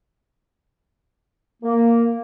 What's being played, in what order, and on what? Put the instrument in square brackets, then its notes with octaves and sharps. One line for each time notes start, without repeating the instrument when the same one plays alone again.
[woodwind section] A#3